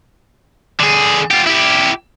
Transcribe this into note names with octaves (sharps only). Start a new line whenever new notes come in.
D3 G#4
F4 G4
E4 G4